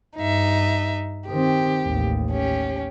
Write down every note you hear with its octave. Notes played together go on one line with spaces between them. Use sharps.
G2 D#4 E5
D#3 C4 G4
A1 D#2
C#4 G4